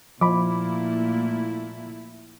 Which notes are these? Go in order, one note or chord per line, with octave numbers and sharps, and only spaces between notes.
A#2 F3 A3 A#3 E4 B5 D6